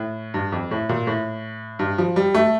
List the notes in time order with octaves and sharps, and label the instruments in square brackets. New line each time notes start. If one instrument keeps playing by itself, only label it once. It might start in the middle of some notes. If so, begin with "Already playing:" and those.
Already playing: [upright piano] A2
G2
F2
A2
A#2
A2
G2
F3
G3
A3